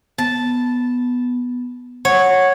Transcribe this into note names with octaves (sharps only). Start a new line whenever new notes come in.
B3 A5
C#5 F#5